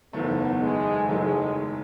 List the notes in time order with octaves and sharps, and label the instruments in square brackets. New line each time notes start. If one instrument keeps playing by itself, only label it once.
[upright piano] F#1 E2 D#3 F#3 A3 [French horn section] B3
[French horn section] G#3
[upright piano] F#1 E2 D#3 F#3 A3 [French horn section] G#3